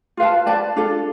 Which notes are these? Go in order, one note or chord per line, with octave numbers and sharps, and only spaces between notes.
F4 B4 F5 A5
B4 D5 A5
D4 F4 A4